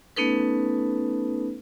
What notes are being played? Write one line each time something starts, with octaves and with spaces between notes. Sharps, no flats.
A3 B3 C#4 D#4 A4 B4